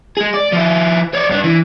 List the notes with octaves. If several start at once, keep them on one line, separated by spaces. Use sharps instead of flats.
G#3 G#4
D5
F3 E4
C#5 D5
G2 D4
E3